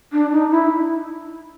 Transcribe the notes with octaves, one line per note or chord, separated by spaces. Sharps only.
D4
D#4
E4